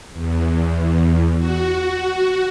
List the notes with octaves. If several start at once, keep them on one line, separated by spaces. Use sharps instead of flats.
E2
F#4